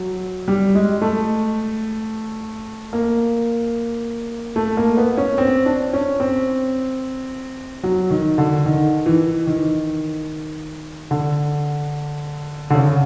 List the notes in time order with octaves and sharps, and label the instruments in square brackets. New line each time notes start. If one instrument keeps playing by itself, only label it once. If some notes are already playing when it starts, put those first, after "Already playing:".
Already playing: [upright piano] F#3
G3
G#3
A3
A#3
A3
A#3
B3
C#4
C4
D4
C#4
C4
F#3
D#3
D3
D#3
E3
D#3
D3
D3
C#3